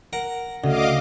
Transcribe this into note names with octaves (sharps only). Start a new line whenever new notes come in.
A#4 F#5
D2 C#3 D#5 F5 D6